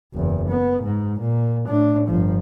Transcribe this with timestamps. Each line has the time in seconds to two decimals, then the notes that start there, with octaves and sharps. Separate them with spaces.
0.14 F#1 E2
0.49 B3
0.83 G#2
1.20 A#2
1.68 A2 D4
2.07 G1 F3